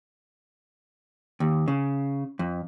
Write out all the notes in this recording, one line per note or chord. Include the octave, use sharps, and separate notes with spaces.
D#2
C#3
F2